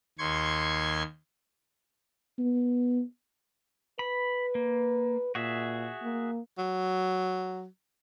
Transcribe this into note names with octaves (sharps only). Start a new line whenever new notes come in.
D#2 C6 C#6 G#6
B3
B4 B5
A#3
A#2 F#4 G#4 E5
A#3
F#3